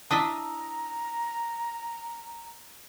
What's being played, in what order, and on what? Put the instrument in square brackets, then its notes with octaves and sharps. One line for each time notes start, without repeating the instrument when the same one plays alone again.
[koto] D4 D#5 E5 [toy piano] E4 A5 [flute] A#5 [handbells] D#6 E6